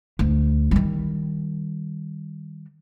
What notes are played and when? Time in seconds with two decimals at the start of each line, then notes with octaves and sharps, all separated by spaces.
0.19 D2
0.71 D#3 G3